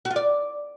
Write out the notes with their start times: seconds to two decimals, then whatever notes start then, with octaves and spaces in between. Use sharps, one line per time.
0.05 F#4
0.11 F4
0.16 D5